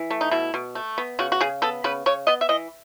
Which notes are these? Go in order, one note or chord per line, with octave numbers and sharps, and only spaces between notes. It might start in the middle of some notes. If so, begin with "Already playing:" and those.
Already playing: E3
A3
D#4
B2 E4
B2
A3
B3
C#3 F#4
F#4
C#3 G#4
B3 A4
C#3 B4
C#3 C#5
B3 D#5
E5
E3 D#5